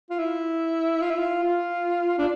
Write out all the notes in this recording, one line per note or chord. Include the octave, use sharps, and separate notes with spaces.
F4
E4
F4
E4
F4
F4
D4